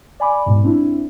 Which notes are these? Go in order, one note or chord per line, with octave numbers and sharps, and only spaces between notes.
D5 G#5 B5 D6
G#2 B2
C4 D4 E4